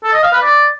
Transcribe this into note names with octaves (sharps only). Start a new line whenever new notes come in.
A4
D#5
F5
B4
D5